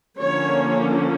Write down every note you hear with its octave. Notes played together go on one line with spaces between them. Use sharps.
D3 F3 A#3 C#4 C#5